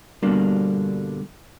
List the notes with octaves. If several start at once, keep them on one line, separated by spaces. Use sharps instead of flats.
G2 B2 D3 G3 A#3 D4